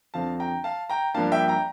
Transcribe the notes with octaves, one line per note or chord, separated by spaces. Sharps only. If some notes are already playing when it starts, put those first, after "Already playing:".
F2 D3 F3 C4 F5 A5
G5 A#5
F5 A5
G5 A#5
G2 F3 A#3 D4 F5 A5
E5 G5
G5 A#5